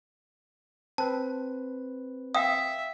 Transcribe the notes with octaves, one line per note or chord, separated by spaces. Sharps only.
C4 B4 A5
E5 F5 G5 D#6